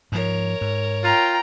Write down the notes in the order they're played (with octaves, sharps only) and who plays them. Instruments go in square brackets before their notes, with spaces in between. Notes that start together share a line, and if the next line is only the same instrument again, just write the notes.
[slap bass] G#2 F3 [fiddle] A#4 C#5
[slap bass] G#2
[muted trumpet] F4 [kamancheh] G5 A#5